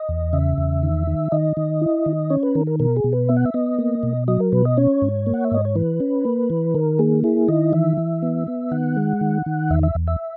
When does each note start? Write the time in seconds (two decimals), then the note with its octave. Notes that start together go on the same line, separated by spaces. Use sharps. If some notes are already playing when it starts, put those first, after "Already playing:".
Already playing: D#5
0.09 E2
0.33 C#3 E5
0.58 E2
0.83 D#3
1.07 D#3
1.32 D#3 D#5
1.57 D#3
1.81 E4
2.06 D#3
2.30 C#4 C#5
2.43 B4
2.55 D#3 A#4
2.67 A#4
2.80 B2 A#4
2.96 G#4
3.04 B2
3.13 B4
3.29 B3 E5
3.37 F#5
3.45 E5
3.54 B3 D#5
3.78 A#3
4.03 B2
4.28 F#3 D#5
4.40 A#4
4.52 B2 B4
4.65 D#5
4.77 C#4 C#5
5.02 G#2
5.26 A#3
5.34 F#5
5.44 E5
5.51 G#2 D#5
5.65 C#5
5.75 E3 B4
6.00 C#4
6.25 A#3
6.50 E3
6.75 D#3 A#4
6.99 A#3 G#4
7.24 E4 G#4
7.48 D#3 D#5
7.73 E3 E5
7.97 E3
8.22 B3
8.48 B3
8.71 D#3 F#5
8.96 G#3
9.21 D#3
9.46 D#3
9.70 E2 E5
9.83 E5
9.95 E2
10.08 E5